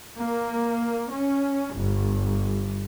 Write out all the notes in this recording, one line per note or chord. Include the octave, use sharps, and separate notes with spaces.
A#3
C#4
G1